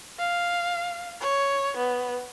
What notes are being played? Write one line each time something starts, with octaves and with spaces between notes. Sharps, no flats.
F5
C#5
B3